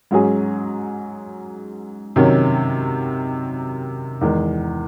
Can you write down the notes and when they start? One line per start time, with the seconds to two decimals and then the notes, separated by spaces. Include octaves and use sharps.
0.11 G#2 F#3 C#4 G#4
2.16 C3 D#3 F#3 C#4
4.21 E2 D#3 G#3